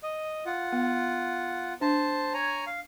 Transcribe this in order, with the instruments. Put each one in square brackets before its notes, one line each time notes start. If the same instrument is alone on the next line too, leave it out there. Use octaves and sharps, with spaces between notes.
[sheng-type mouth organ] D#5
F4 F#5
[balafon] B3
[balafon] D4 [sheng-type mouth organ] C5 A5
[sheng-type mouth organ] C#5 G#5 A#5
F5